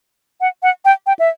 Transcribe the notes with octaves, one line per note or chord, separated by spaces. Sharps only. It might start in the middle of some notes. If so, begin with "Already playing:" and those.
F#5
F#5
G5
G5
E5